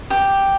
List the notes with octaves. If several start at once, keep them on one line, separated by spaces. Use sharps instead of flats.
G4